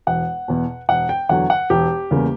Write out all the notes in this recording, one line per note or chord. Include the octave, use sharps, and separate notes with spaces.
E1 F#5
E2 B2
E1 F#5
G5
E2 D3 F#3 F#5
F#5
E1 G4
E2 C#3 G3 A#3